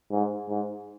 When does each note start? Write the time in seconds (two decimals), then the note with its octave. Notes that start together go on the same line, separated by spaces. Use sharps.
0.12 G#2
0.49 G#2